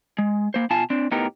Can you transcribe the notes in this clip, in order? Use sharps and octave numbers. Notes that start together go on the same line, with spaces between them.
G#3
A#3 C5
B2 F4 F5 G#5 A5
C4 D4
A2 B3 D#4 G4 A#4